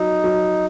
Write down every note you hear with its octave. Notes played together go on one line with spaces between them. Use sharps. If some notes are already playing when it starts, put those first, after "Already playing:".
Already playing: F#3 D#4
F#3